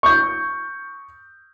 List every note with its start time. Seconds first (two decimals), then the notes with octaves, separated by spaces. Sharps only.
0.03 C#6 G6